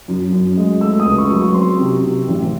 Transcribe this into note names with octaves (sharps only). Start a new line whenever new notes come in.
F#2
F#2
G#3
A3 E6
D#6
C#2
C#6
F#3
C#6
C4 C6
C3
C3
A1